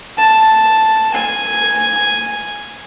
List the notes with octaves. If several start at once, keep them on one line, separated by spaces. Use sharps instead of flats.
A5
G#5